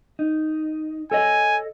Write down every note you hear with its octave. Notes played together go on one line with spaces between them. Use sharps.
D#4
A4 C#5 D#5 G#5